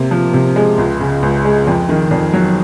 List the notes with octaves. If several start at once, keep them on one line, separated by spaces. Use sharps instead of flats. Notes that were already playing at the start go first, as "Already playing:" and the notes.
Already playing: C3 A#3
F3
C3
G#3
C#2
C#3
C#2
G#3
F2
D#3
F2
F#3